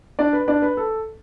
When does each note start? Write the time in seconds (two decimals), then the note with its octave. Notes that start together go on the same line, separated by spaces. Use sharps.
0.19 D4 D5
0.33 B4
0.48 D4 D5
0.62 B4
0.77 A4